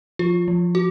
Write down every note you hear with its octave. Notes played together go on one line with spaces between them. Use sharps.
F3 F4
F3
F#4